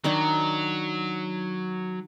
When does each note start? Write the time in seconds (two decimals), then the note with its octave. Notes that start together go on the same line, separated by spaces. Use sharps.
0.04 D#3 F#3 D4 D#4